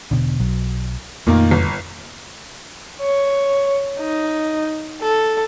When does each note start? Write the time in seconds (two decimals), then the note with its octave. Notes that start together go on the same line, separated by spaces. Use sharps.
0.11 E1 B2 D3
0.40 B1 F#3
1.27 F2 A#2 D#3 A3 A#3
1.51 G1
3.02 C#5
3.99 D#4
5.02 A4